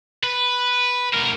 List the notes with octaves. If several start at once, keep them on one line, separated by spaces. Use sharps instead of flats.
B4
D2 A#4